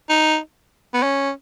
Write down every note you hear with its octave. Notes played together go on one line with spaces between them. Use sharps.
D#4
B3
C#4